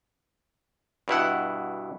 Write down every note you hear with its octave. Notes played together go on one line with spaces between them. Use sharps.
G2 B2 E4 F#5